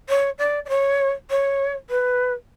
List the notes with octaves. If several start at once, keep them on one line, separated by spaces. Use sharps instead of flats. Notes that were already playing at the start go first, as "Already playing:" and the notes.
C#5
D5
D5
C#5
C#5
B4